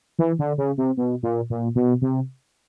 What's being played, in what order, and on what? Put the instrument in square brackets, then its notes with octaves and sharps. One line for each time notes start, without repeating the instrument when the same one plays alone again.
[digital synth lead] E3
D3
C#3
C3
B2
A#2
A#2
B2
C3